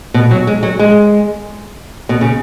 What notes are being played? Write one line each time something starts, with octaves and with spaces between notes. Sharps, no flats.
B2
F#3
G#3
F#3
G#3
B2
C#3